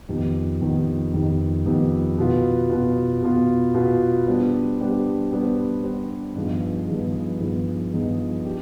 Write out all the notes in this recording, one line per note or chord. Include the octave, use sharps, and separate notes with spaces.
F2 D#3 B3 D#4 G4
F2 D#3 B3 D#4 G4
F2 D#3 B3 D#4 G4
F2 D#3 B3 D#4 G4
B2 B3 F4
B2 B3 F4
B2 B3 F4
B2 B3 F4
G3 B3 D4 G4 C5
G3 B3 D4 G4 C5
G3 B3 D4 G4 C5
G3 B3 D4 G4 C5
G2 F3 B3 D#4 G#4
G2 F3 B3 D#4 G#4
G2 F3 B3 D#4 G#4
G2 F3 B3 D#4 G#4
D4 G4